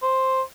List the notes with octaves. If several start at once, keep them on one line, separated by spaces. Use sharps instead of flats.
C5